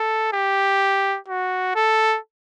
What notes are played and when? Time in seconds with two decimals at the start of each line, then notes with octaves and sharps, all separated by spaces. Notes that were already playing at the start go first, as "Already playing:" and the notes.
Already playing: A4
0.33 G4
1.28 F#4
1.75 A4